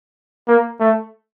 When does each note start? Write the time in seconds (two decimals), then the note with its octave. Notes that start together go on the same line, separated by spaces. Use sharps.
0.48 A#3
0.80 A3